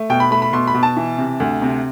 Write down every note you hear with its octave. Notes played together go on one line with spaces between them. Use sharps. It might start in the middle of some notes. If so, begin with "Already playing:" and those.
Already playing: A3
B2 G5
B5
A3 B5
B5
B2 C6
B5
B2
A5
E3
C3
D2
C3